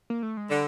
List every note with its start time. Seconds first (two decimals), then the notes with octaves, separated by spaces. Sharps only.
0.10 A#3
0.23 A3
0.37 G#3
0.50 D3 G3